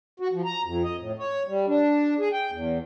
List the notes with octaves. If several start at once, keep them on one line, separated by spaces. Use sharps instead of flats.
F#4
F3
A#5
F2
D#5
A2
C#5
G3
D4
G#4
G5
E2